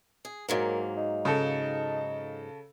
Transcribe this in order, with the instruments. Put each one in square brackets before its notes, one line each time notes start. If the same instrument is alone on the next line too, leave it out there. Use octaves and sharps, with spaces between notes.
[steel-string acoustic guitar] G#4
[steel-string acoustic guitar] G#2 F#3 A#3 [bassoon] A#4
[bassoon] D#4
[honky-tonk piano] C#3 A4